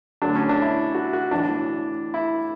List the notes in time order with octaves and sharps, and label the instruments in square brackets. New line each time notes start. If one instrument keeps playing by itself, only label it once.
[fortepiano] D2 D3 F#3 D4
C#4
D4
E4
F#4
F#4
B1 A2 E3 D4
E4